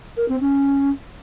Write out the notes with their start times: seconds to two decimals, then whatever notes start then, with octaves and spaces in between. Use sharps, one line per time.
0.17 A#4
0.28 C4
0.40 C#4